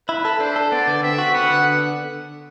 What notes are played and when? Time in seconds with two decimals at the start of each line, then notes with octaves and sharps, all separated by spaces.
0.09 E4 B4
0.25 A4
0.40 D4 C5
0.56 A4
0.71 B3 D5
0.87 D3
1.03 C4 E5
1.18 F#4
1.34 B3 F#5
1.50 D3